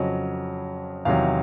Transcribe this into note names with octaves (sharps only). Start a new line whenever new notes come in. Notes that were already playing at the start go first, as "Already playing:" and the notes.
Already playing: F2 C#3 F#3 D#5
E2 C3 D#3 F#3 F5